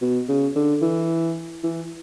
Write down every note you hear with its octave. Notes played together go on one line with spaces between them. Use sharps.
B2
C#3
D3
E3
E3